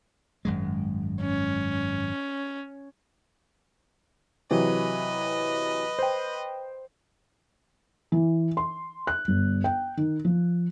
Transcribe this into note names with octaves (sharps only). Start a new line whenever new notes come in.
G#1 F#2 G#3
C#4
C3 E3 F#3 B4 D#5
C5 G5
E3
C6
F#6
G1
G5
D#3
F3